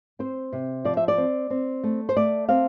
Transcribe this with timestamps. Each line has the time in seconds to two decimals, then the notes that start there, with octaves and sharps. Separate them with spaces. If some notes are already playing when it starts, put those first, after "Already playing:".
0.19 C4 C5
0.52 C3
0.84 F3 D5
0.97 E5
1.08 D5
1.18 C4
1.50 C4
1.83 A3
2.09 C5
2.16 A3 D5
2.49 C4 F5